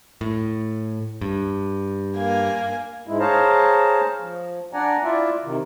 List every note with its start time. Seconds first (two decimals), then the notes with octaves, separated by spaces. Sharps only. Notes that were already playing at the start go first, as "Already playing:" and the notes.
0.21 A2
1.21 G2
2.16 A#3 G#5
3.07 G#2 G#3 E4
3.20 G#4 C5 C#5 F5 A5 A#5
4.20 F3
4.73 D4 D5 F#5 G#5 A#5
5.04 E4 F4 D5 E5
5.44 C3 D#3